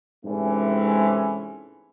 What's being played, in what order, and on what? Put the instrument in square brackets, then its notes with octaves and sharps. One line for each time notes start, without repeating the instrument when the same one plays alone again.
[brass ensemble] G#2 C3 E3 A3 C4 C#4